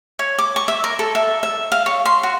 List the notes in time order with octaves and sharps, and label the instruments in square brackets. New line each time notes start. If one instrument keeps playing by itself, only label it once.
[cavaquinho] C#5
D6
C#6
E5
A#4
A4
E5
E5
F5
C#5
C6
F#4